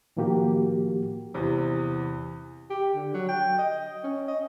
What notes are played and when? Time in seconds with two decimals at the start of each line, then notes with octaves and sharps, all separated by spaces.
0.17 A2 D#3 F3 A#3 F#4 G4
1.34 E2 C3
2.70 G4
2.95 D3
3.14 F#3
3.29 G5
3.59 D#5
4.04 C#4
4.28 D#5